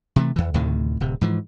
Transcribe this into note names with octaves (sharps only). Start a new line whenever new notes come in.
C3 E3 A3
E2 E3
D2 A2 C3 D#3
D1 C3
G#2 E3 F3